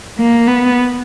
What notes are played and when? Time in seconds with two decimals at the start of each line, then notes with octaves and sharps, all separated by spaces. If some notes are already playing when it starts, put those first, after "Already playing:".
0.18 A#3
0.47 B3